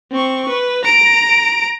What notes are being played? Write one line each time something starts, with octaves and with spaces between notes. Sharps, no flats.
C4 C#6
B4
A#5 D7